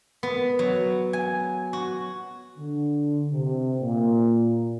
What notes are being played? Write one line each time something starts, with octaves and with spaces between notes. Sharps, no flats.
B3
F#3
G#5
F#4
D3
C3
A#2